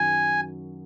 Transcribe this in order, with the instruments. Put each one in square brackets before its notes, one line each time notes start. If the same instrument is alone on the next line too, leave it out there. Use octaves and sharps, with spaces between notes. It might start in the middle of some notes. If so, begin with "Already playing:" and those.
Already playing: [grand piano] F#2 D#3 F#3 [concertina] G#5